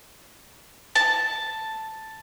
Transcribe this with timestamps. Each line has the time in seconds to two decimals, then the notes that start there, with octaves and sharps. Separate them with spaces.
0.95 A5